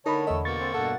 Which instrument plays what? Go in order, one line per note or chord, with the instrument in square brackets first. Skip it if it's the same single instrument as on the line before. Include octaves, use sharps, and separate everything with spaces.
[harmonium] D3 [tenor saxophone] D#4 [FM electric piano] A#4 B5 [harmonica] C#5 A5
[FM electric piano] E2 D#5 [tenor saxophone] A3
[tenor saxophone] B2 [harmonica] A#3 C#6 [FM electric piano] A6
[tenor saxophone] C4
[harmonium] G2 B2 F#5 [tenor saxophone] A4